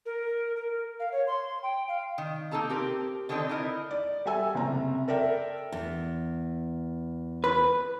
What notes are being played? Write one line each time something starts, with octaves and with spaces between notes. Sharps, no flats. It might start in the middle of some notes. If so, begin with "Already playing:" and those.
A#4
A#4
F5
C#5
C6
G5
F5
D#3
A#3 D#4 G4 A4 A5 A#5
C4 G4 A#4
D3 D#3 C4 D4 D#4 A4
D#4 E4 A#4 D#5
D5
G3 A4 E5 G#5 E6
F#1 C3 A#5
A4 A#4 D5 E5 G5
E2
B4